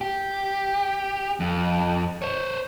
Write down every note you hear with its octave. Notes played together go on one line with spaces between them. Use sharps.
G4
F2
C5 C#5